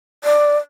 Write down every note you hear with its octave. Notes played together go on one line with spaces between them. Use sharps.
D5